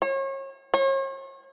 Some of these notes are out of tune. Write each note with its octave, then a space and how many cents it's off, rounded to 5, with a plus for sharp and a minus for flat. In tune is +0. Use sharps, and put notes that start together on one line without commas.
C#5 -35
C#5 -40